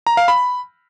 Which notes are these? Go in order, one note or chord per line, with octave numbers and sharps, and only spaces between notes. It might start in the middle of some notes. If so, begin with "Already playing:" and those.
A#5
F5
B5